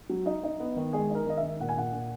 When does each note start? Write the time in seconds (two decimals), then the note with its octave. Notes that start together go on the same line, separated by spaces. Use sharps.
0.10 F#3
0.26 D#4
0.44 D#4
0.60 B3
0.76 D#3
0.93 G#3 G#4
1.10 D#4 A#4
1.27 D#3 D#5
1.37 E5
1.43 D#3
1.60 A#2 F#5
1.69 G#5
1.77 A#2 F#5
1.93 A#2